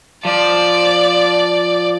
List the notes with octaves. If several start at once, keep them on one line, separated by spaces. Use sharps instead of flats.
F3 D5